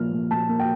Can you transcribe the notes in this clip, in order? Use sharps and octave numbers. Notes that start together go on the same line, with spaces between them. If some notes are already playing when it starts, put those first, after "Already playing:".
Already playing: A#2 F3 A#3 F6
A#2
A#2 A5
A#3
G5